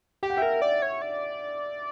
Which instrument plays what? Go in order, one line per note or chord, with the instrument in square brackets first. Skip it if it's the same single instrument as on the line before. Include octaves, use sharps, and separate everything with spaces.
[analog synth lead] G4 [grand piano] G5
[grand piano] F#5
[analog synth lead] A#4 [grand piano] E5 G5
[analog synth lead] D5
C#5
D5